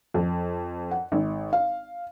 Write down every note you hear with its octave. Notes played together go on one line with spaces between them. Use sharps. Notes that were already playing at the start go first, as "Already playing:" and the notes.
F2
F#5
G#1
F5